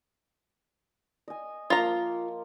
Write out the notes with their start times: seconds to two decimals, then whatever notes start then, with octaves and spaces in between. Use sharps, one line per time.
1.28 D#5 G#5
1.70 F3 A#3 F4 A#5